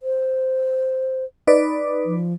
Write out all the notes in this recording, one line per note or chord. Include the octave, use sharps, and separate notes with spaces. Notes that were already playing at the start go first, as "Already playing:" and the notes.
C5
D#4 B4 D5
F3